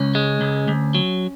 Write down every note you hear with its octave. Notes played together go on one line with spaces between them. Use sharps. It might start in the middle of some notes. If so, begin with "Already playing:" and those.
Already playing: C#2 C#4
G#3
C#2
D2
F#3